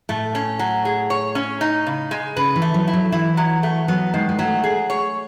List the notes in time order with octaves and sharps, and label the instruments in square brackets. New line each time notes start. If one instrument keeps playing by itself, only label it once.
[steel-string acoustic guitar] A2 [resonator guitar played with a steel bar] A3
[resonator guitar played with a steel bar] C#4
F#3
G#4
C#5
C#4
D#4
C#3
G#3
[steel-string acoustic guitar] C#3 [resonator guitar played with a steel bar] B4
[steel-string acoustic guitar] E3
[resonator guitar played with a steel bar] A3
[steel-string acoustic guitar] F#3
[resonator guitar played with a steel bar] E4
[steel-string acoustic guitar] F#3
[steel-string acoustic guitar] E3 [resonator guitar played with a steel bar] E4
[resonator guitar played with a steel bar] F#3
A3
[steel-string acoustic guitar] F#3 [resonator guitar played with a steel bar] B3
[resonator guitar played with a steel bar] D#3 [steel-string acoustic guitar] G#3
[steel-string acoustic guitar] G#3
[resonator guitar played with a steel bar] F#3 [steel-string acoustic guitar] A3
[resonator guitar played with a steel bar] G#4
C#5